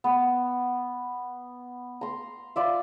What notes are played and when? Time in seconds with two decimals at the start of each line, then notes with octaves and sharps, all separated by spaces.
0.04 B3
2.01 A#5 C6
2.56 F4 D5 E5